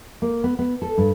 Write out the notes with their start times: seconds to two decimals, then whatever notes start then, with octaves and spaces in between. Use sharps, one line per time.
0.22 A#3
0.44 B3
0.59 B3
0.82 A4
0.98 G2